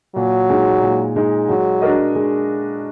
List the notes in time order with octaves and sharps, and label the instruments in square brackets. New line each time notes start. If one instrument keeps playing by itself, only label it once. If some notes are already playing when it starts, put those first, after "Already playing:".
[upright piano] A#2 [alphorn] F#3
[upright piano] G#3 D#4
A#2
G#3 D#4
[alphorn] F#3 [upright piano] G#3
[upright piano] D4 F#4 A#4 D#5
G#3